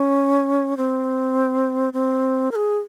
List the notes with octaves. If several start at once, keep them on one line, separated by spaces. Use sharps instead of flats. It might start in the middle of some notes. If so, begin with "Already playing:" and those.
Already playing: C#4
C4
C4
A#4
G#4